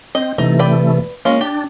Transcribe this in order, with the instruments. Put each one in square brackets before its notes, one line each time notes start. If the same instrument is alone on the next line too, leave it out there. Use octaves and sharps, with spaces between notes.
[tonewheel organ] C4 [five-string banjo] D#5
[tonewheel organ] C3 E3 A3 [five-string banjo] D#4
[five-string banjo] B4 D5 G5
[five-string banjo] G#3 C#4 F4 [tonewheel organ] A#3
[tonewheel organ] D4 [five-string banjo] G4